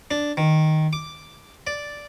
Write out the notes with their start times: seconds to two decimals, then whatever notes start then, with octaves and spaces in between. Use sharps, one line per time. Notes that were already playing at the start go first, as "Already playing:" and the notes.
0.11 D4
0.37 D#3
0.93 D6
1.67 D5